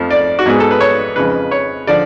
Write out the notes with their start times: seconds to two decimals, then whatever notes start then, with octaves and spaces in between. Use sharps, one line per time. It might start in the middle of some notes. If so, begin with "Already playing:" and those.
Already playing: F2 F3 A3
0.11 D5
0.39 F#4
0.46 G#2 G#3 B3 G#4
0.60 A4
0.71 B4
0.81 C#5
1.16 F2 C#3 F3 G#3 B4
1.51 C#5
1.87 D3 F3 D5